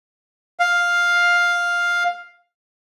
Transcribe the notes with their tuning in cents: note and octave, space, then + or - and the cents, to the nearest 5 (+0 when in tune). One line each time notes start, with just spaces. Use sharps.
F5 +5